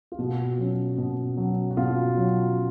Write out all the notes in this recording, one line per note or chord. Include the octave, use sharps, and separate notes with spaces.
F4
B2 F#4
F#3 C#4
B2
F#3 C#4
F#4
B2 F4
F#3 C#4